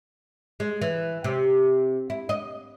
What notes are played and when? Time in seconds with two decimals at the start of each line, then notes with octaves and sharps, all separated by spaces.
0.60 G#3
0.82 E3
1.24 C3
2.10 E4
2.29 D#5